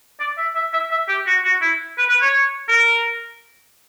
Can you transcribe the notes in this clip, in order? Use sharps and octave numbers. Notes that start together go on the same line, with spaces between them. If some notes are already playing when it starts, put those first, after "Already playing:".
D5
E5
E5
E5
E5
G4
F#4
F#4
E4
B4
B4
C#5
A#4